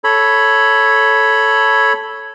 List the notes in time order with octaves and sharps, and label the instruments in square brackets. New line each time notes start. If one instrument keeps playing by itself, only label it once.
[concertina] A4 C#5 B5